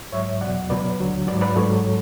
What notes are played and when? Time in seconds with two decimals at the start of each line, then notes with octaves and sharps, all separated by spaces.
0.12 G#2 F#3 C#5 E5
0.41 E2 B2 F#3 D5 F#5
0.70 C#2 B2 F#3 B4 D5
0.99 D2 D3 F#3
1.27 G#2 F#3 B4 D5
1.41 B4 D5
1.56 G#2 F#3 A4 C#5